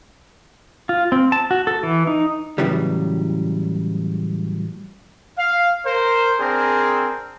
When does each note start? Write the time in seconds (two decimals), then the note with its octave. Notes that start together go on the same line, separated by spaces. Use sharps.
0.89 F4
1.12 C4
1.32 A5
1.51 F#4
1.67 A4
1.83 E3
2.07 D#4
2.58 A2 C#3 E3 F#3 G3
5.38 F5
5.86 A#4 C5
6.40 C4 D4 G#4 A#4